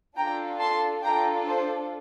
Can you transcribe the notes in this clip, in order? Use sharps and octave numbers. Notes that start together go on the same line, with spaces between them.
D4 F4 A4 G5 A#5
A5 C6
D4 F4 A4 G5 A#5
C5